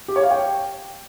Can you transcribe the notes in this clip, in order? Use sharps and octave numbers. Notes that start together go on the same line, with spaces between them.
G4
C#5
F5
G5